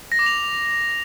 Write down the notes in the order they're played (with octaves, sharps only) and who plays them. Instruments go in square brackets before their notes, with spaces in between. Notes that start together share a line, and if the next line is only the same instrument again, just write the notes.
[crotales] A#6
D6
F7